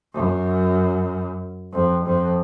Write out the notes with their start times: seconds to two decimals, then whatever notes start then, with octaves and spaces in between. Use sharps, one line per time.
0.13 F#2
1.73 F2
2.05 F2